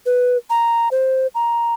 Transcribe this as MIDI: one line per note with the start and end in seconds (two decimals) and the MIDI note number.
0.06 0.37 71
0.50 0.89 82
0.92 1.27 72
1.35 1.74 82